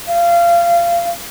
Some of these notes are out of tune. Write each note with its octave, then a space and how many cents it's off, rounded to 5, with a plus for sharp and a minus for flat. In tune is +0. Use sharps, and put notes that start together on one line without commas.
F5 -25